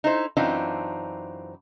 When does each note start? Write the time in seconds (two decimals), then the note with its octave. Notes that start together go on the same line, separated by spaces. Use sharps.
0.04 D#4 E4 C5
0.37 F#2 E3 C4 D4 D#4 F4